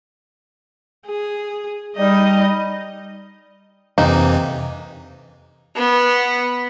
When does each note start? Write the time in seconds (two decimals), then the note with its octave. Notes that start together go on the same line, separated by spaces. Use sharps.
1.07 G#4
1.97 G3 D#4 D#5
3.98 F2 C3 E3 A#3 C4 D#4
5.77 B3